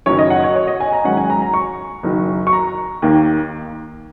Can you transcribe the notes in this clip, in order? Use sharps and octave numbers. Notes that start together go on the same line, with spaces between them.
F#1 F#2 D#3 F#3 C#4 C#5
D#5
F#5
C#5
C#5
D#5
G#5
A#5
G#2 D#3 F#3 C#4 F#5
G#5
A#5
A#5
C#6
F#1 F#2 D#3 F#3
C#6
A#5
D#2 D#3 A#3